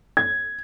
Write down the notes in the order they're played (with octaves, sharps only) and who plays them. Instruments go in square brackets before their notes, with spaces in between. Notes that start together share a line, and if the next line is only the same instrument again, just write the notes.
[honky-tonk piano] G#6